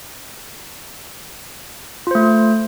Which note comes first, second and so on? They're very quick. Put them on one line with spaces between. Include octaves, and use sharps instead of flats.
F4 C5 A3